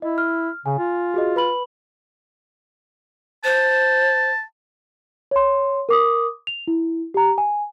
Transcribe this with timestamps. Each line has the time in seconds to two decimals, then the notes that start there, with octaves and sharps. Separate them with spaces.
0.02 E4 D#5
0.18 F6
0.66 C#3 G#5
0.79 F4
1.14 F#4 G#4 D#5
1.36 B4 B5 F#7
3.44 C5 A5
5.31 C#5 C6
5.89 A#4 D6 D#6
6.47 F7
6.67 E4
7.14 G4 A#5
7.38 G#5